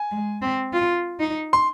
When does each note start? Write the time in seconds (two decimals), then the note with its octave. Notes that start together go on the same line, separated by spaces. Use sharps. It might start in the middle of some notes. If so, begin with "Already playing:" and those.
Already playing: G#5
0.11 G#3
0.42 C4
0.73 F4
1.20 D#4
1.53 C6